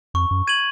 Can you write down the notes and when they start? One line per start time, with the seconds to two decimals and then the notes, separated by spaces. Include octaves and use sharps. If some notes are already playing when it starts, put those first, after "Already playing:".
0.14 F2 C#6
0.31 F#2
0.47 G#6 D#7 F#7